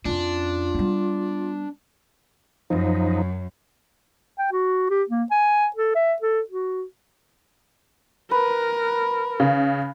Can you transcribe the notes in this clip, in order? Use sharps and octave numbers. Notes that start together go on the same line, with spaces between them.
F2 C#4 D4 F4
G3 B3
F#2 F3 D#4
G5
F#4
G4
A#3
G#5
A4
E5
A4
F#4
A#4 B4
C#3